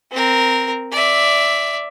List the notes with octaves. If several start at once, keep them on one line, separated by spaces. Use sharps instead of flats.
C4 A#4
D5 E5